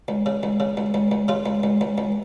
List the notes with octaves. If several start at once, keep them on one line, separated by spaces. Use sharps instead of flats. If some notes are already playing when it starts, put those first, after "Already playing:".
C#2
C#3
C#2
C#3
C#2
C#2
C#2
C#3 F4
C#2
C#2
C#2
C#2